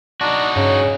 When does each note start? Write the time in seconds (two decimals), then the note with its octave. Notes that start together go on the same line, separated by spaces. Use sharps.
0.21 D4 D#4 F#4
0.56 G2 C#3 C#4